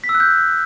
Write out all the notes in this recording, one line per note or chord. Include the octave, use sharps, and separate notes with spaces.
B6
E6
F#6
G6